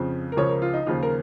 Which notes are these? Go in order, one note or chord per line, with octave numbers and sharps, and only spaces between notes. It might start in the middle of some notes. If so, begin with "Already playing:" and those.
Already playing: F2 C#3 F3
A#4
C#2 C#3 F3 C#5
A#4
F4
D#4
D#2 C#3 F3 F4
A#4